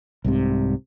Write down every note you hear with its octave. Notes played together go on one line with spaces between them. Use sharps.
C2 G#2 C3